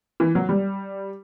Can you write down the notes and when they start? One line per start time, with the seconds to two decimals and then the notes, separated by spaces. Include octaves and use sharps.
0.20 E3
0.35 F#3
0.49 G3